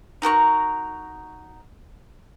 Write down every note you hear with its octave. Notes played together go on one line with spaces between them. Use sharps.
D#4 F#4 A#4 C#6